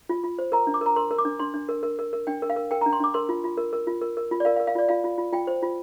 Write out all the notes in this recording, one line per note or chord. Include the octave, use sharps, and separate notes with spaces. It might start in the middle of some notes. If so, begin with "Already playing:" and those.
F4
F4
C5
A#4 A#5
D4
D6
A#4 A#5
A#4 C6
A#4
D6
D4
D4 C6
D4
A#4
A#4
A#4
A#4
D4 G5
A#4
F5
A#4
A#4 G5
A#5
D4
C6
D4 D6
A#4 C6
F4
F4
A#4
A#4
F4
A#4
A#4
F4
D5
A#4 F5
F5
A#4
F5
F4 D5
F4 F5
F4
F4
F4 G5
C5
F4